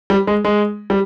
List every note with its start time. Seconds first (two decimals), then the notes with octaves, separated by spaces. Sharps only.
0.10 G3
0.27 G#3
0.45 G#3
0.90 G3